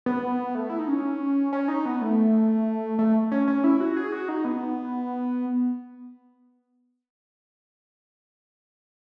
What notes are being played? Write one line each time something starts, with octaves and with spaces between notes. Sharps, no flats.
B3
A3
E4
D#4
C#4
C#4
D#4
B3
A3
A3
C#4
C#4
E4
F#4
G#4
F#4
D#4
B3